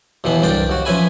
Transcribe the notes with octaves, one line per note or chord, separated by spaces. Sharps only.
D#2 B2 E3 B3
C2 G2 D4 D5 G5
D#2 F#4
F3 C#4 B4 E5 G#5 B5